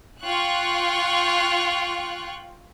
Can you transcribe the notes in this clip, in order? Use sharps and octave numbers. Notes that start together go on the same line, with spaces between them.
F4 G5 C#6 F#6